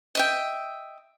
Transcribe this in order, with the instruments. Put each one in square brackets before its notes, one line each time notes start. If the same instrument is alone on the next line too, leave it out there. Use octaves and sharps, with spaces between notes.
[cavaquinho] D#5 E5 G5